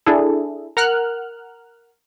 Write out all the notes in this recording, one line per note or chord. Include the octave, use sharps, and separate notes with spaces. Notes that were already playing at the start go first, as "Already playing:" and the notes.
D4 E4 G#4 A4
A#4 F#5 F6 F#6